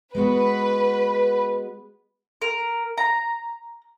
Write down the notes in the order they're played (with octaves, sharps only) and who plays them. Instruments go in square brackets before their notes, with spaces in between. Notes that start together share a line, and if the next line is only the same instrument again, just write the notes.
[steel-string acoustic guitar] G#3 B3 F#4 [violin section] B4
[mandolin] A#4
A#5